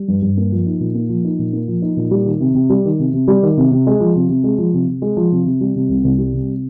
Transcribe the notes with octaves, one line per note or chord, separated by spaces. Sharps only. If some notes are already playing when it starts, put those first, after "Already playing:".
Already playing: G3
G2
G2
A#3
F3
D#4
A#2
A#3
F3
D#4
A#2
A#3
F3
D#4
A#2
G3
D#3
C3
C3
G3
D#3
C3
C3
G3
D#3
C3
C3
G#3
F3
C3
C3
G#3
F3
C3
C3
G#3
F3
C3
C3
G3
C3
C2
C2
G3
C3